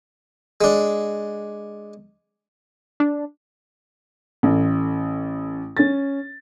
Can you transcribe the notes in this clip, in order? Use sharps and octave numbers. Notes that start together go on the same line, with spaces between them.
G#3 D4
D4
A1
C#4 A6